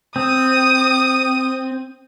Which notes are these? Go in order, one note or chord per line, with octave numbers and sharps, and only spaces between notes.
C4 D#6